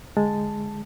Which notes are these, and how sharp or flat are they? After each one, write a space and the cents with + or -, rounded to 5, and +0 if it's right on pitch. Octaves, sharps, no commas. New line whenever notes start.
D3 +0 G#3 +0 A5 +0